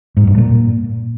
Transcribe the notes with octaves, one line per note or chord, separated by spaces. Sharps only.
G#2
G2
A#2